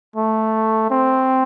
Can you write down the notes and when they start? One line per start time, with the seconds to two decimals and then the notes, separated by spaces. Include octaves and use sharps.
0.16 A3
0.90 C4